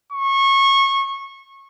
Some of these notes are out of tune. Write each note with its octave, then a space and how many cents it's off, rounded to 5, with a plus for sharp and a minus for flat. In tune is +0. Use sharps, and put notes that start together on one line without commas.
C#6 -25